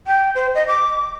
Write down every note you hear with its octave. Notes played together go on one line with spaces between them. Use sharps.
G5
C5
D#5
D6